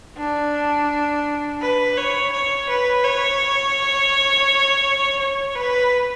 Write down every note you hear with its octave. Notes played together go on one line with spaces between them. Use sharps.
D4
B4
C#5
C#5
B4
C#5
C#5
B4